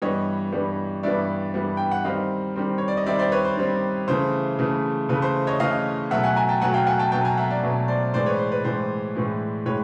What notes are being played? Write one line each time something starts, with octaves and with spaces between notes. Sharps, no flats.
G2 E3 G3 B3 C#5 D#5
G2 E3 G3 B3
G2 E3 G3 B3 D5 E5
G2 E3 G3 B3
G5
F#5
D#3 G3 C4 D#5 F5
D#3 G3 C4
C#5
D5
D#5
D#3 G3 C4 D5 E5
C5 D5
B4 C#5
C5
D#3 G3 C4
C#3 E3 A3 C5
C#3 E3 A3
C#3 E3 A3 B4
C5
C#5 D#5
C#3 E3 A3 D#5 F5
B2 F#3 A3 E5 F#5
F#5 G#5
G#5 A#5
G5 A5
B2 F#3 A3 F#5 G#5
F5 G5
F#5 G#5
G5 A5
B2 F#3 A3 G5 A5
G#5 A#5
E5 F#5
D5 E5
B2 F#3 A3
C5 D5
A2 E3 G#3 C5 D5
B4 C#5
C5
B4
A2 E3 G#3 C5
A2 E3 G#3
A2 E3 G#3 B4 C#5